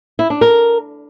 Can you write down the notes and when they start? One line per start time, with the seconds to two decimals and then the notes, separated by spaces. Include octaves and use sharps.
0.19 E4
0.30 D4
0.41 A#4